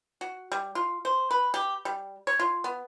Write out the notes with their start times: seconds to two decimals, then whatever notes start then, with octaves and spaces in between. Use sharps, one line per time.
0.21 F#4
0.52 G3
0.75 F4
1.05 C5
1.31 B4
1.54 G4
1.85 G3
2.27 C#5
2.39 F4
2.64 B3